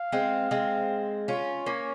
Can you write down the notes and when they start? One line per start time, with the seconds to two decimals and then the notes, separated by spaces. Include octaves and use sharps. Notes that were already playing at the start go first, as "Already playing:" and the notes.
Already playing: F5
0.12 G#3 C4
0.51 G#3 C4
1.28 C#4 F4 C#5
1.66 A#3 C#4